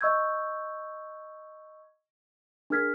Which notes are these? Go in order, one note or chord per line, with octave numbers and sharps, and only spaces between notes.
D#5 C#6 E6 G6 G#6
D4 G#4 A#4 F6 G#6 B6